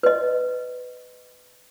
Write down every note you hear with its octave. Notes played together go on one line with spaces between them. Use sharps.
B4 D#5